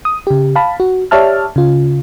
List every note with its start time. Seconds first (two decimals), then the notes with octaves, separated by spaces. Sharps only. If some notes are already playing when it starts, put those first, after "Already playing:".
0.05 D#6
0.27 C#3 G4
0.56 F5 A5 B5
0.80 F#4
1.11 G4 C#5 D5 E5 A5 F6
1.56 C#3 F4